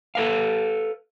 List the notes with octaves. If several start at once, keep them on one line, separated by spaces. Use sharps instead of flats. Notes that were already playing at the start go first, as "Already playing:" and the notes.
A4 B4 F5